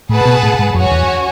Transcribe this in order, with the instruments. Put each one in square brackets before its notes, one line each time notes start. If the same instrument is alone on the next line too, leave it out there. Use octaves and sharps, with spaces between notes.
[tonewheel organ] A2 [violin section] G#4 B4 F#5 A5
[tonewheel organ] B2
A2
G#2
[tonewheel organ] F#2 [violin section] C#4 F#4 C#5 G#5
[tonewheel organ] E2